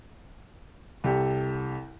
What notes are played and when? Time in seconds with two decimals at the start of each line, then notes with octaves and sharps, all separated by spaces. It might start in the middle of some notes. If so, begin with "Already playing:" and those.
1.04 C2 G4 A4